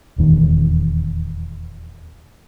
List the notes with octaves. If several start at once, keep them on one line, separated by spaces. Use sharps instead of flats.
D#1 E2 D#3